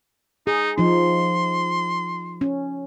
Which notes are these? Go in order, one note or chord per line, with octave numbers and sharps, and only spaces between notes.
D#4 G#4
F3 D#4 C6
C#4